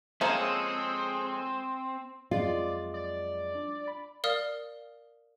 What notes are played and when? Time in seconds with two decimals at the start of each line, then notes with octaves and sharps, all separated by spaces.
0.21 F3 G#3 A#3 C4 C#4 G#4 A4
2.31 F2 F#3 G#3 F4 D5
2.94 D5
3.55 D4
3.88 B5
4.24 A#4 D5 F5 D#6 F6